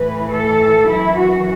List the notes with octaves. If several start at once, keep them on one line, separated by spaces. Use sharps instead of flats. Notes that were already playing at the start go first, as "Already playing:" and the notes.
Already playing: A2 E3 B4
A4
F#2 E3 E4
F#4